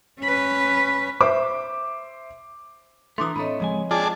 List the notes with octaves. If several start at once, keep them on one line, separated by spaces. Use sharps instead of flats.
C#4 B4
C5 E5 D6
E3 A3 D4 A#5 C6 D6 D#6
A2 A3 C4 C#5 D#5 B5
C#2 F3 G#3 G#5
F4 G#4 D5 G5 A5